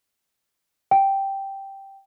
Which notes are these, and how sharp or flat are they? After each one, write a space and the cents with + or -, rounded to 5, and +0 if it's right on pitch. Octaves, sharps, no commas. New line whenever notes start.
G5 -5